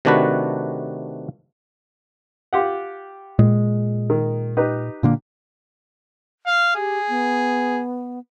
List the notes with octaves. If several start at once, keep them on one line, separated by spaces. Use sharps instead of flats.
C3 D#3 A3 D4 F#4 B4
F4 G4 F#5
A#2 G#3
D#3
D#4 G4 B4
A#2 D3 A#3
F5
G4 G#4
B3